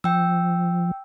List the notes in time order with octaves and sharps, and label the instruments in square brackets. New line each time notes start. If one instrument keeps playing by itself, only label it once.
[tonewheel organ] F3 [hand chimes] G5 E6